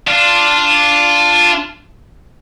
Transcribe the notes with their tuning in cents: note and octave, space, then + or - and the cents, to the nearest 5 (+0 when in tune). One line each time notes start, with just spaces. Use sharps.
D4 +0 F4 +0